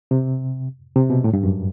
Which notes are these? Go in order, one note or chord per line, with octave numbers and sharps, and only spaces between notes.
C3
C3
B2
A2
G2
F#2